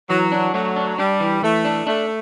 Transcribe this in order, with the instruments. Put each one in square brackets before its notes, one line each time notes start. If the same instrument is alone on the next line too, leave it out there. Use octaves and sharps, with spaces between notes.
[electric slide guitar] E3 [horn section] F#3
[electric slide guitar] D4
[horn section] F#3 [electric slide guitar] A3
[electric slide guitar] D4
[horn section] G3 [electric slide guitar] D4
[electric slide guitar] E3
[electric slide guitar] E3 [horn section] A3
[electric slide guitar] D4
[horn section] A3 [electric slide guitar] D4